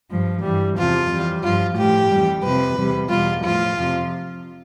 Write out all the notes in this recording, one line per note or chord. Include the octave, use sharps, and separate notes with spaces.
G2 F3
G2 E3 G3
E2 C3 F3 F4
F2 E3 G3
G2 F3 F4
A2 F3 G4
F2 E3 G3
F2 C3 F3 B4
E2 C3 G3
E2 B2 G3 F4
A2 F3 F4
F2 C3 F3